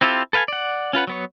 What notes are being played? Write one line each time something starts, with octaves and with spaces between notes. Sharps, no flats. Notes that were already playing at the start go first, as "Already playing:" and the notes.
C4 E4 F4 G4 A4
A4 B4 F5 G5 G#5
D5 F#5
C#4 F4 B4 F#5
F#3 B3 C#5